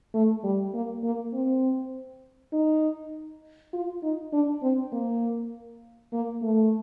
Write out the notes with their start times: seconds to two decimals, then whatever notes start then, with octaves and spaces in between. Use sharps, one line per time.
0.14 A3
0.44 G3
0.74 A#3
1.04 A#3
1.33 C4
2.53 D#4
3.73 F4
4.03 D#4
4.33 D4
4.63 C4
4.92 A#3
6.13 A#3
6.42 A3